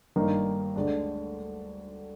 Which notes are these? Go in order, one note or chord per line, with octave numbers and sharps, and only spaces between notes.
G1 G2 D#3 A#3 D#4
D2 D3 G#3 D4